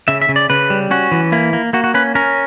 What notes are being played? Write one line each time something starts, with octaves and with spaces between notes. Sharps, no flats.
C#3 E5
E5
C#3
D5
C#3 B4
G3
C#4 F#4
E3
A#3 E4
A#3
A#3 F#4
F#4
C#4 B4
C#4 A#4